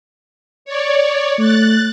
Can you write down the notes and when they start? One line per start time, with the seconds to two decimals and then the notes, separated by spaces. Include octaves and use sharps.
0.65 C#5 D5
1.38 A3 F#6 A6